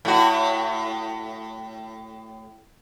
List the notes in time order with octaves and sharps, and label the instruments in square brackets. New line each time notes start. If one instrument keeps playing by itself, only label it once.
[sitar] A2 F#4